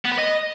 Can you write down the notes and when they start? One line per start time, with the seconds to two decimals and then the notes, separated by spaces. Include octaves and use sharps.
0.05 B3
0.12 B4
0.19 D#5